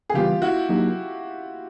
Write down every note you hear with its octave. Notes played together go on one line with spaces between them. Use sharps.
G#4
C#3 E3 G3 B3 F4 G4
E4 F#4
F#3 A#3 D#4 G4